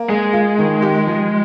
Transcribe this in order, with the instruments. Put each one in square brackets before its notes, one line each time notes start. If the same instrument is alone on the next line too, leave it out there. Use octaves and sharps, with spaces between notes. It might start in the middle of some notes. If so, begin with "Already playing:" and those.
Already playing: [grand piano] A#3
[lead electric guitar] G#3 [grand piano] G#4
[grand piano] F4
D#3
G4
F3